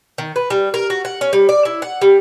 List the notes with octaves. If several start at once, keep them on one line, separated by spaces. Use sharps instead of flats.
D#3
B4
G3
A#4
F#4
F#5
C#4
G3
D5
E4
F#5
G3